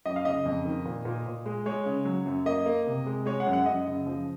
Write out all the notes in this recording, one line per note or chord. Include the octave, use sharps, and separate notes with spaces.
F#2 D#5
F5
C#3 D#5
F2
D#3
A#2
A#2
A#2
G#3
G#3 C#5
C#3
F#3
F#2
A#3 D#5
A#3
C3
G#3
G#3 C#5
F#5
F#2
F#5
F#2 D#5
C#3
F3